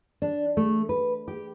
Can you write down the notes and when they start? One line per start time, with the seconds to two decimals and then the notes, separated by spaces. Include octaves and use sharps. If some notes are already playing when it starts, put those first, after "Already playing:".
0.22 D4
0.57 A3
0.89 B4
1.28 G4